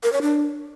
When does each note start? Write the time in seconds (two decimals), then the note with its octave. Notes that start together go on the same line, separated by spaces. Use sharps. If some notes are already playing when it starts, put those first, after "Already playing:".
0.03 A#4
0.13 C#5
0.22 D4